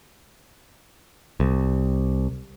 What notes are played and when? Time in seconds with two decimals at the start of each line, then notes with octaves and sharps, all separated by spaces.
1.40 C2